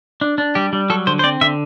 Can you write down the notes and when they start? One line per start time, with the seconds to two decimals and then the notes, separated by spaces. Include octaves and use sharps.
0.21 D4
0.38 D4
0.55 G3 G4
0.73 G3
0.90 F#3 A4
1.07 D3 C5
1.19 C5
1.24 C4 D5
1.41 D3 E5